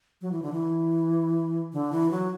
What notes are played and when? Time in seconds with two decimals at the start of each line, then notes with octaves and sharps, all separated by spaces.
0.21 F#3
0.32 E3
0.43 D3
0.52 E3
1.73 D3
1.92 E3
2.11 F#3